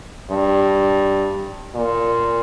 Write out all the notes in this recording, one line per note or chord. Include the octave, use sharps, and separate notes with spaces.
G2
A#2